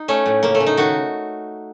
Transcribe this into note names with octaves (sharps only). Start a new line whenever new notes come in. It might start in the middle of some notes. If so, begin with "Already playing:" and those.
Already playing: D#4
A3 C#4
A2
C#3 A#3
A3
C#3
D#4
D#3 F#4